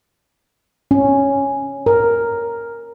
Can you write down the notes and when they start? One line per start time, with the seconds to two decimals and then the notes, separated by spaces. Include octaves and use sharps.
0.91 C#4
1.86 A#4